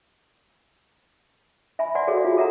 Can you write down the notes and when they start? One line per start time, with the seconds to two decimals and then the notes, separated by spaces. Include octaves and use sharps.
1.79 E5 G#5 B5
1.95 D5 F#5 G#5 C6
2.07 F#4 G#4 A4 C#5 D5 F5
2.25 F4 F#4
2.37 G#4 A4 E5 F#5 A#5